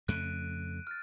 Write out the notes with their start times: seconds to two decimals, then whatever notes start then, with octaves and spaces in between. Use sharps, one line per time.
0.08 F2 C#3 A3 F#6 D7 D#7
0.87 F6 A6